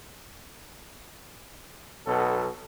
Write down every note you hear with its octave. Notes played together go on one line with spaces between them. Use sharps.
B1 B2 F#3 A4